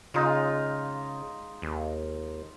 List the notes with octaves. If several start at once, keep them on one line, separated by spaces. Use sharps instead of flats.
C#3 G#3 D#4 F4
D#2